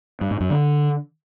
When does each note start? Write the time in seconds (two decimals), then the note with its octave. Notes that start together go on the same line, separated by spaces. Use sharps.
0.21 G2
0.31 G#2
0.40 F#2
0.50 D3